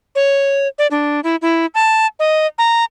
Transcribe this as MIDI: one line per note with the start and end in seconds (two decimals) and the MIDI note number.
0.15 0.68 73
0.79 0.87 74
0.91 1.20 62
1.24 1.36 64
1.42 1.66 64
1.75 2.06 81
2.19 2.47 75
2.58 2.84 82